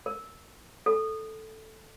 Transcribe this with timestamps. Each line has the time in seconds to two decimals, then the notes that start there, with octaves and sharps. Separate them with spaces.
0.06 A#4
0.86 A4